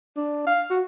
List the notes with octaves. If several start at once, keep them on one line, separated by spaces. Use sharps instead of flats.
D4
F5
F#4